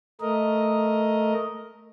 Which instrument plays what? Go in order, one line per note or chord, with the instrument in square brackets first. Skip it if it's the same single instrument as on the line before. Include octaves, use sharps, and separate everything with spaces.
[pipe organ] A3 A#4 D#5